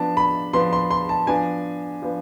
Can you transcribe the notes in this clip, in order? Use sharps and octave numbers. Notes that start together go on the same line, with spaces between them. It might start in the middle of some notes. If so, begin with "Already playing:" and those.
Already playing: F3 B3 D4 A5
B5
F3 B3 D4 C6
C6
C6
A5
F3 B3 D4 G#5
F3 B3 D4